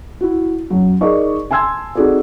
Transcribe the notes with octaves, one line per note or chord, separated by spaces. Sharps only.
E4 F#4
F#2 F#3
D#4 G#4 A#4 D5 D#5 C#6
G#5 A5 C6 E6 G#6
C4 D#4 F#4 G#4 A4 D5